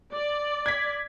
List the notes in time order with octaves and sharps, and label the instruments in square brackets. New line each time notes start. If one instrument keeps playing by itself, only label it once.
[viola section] D5
[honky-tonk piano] G#6 B6